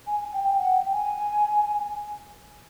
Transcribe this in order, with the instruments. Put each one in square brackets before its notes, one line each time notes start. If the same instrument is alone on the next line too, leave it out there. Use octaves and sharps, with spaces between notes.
[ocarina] G#5
G5
F#5
G5
G#5